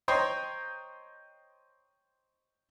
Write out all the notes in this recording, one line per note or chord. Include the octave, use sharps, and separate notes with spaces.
C5 C#5 D#5 G5 A#5 C6